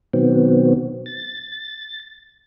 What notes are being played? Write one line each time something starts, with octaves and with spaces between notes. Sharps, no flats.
B2 D#3 F#3 B3 C4
A6